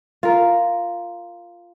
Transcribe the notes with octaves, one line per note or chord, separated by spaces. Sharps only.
F4 A#4